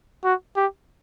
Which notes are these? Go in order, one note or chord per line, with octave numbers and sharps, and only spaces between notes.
F#4
G4